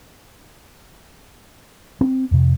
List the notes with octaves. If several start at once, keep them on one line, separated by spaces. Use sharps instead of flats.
C4
F2 C3